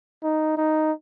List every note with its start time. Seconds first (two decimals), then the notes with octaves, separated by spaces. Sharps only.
0.23 D#4
0.57 D#4